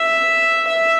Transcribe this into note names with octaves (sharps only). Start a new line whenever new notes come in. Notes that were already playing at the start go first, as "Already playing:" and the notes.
Already playing: E5
E5